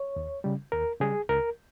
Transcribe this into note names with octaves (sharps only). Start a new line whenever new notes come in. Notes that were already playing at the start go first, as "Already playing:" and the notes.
Already playing: C#5
D#2
C#3 G3
D#2 A#4
C#3 G3 G#4
C#2 A#4